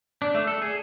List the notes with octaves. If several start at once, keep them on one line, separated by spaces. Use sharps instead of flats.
D4
A3
A4
G#4